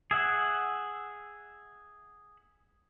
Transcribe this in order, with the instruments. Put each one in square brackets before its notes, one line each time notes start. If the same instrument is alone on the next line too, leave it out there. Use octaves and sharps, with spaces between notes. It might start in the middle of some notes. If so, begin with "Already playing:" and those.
[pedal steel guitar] G#4 E5 F#5